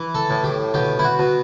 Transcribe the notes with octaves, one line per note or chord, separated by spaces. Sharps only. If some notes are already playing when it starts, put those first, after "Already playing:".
Already playing: E3
A4
A2
G4
B2 G4
E4
F#4
B2